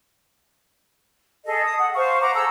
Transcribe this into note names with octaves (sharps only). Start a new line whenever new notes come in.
G#4 A4 D#5
D#6
F#5
C5 F5 C#6
F#5 A#5 D6
G#4 A4 A#5 E6